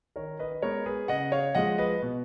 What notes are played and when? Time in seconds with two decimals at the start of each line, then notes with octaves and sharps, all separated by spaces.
0.16 D#3 A#4 C#5
0.39 B4 D#5
0.51 D#5
0.62 G#3 B3 A#4 C#5
0.86 G#4 B4
1.08 C#3 D#5 F#5
1.32 C#5 F5
1.55 F3 G#3 D#5 F#5
1.78 B4 D#5
2.02 B2